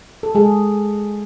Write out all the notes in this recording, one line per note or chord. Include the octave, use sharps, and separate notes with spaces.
A4
G#3 G#4